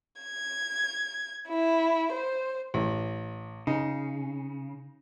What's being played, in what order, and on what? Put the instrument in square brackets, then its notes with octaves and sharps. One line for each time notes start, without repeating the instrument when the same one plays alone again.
[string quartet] G#6
E4
C5
[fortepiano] A1
[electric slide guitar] C#3 [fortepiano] D#4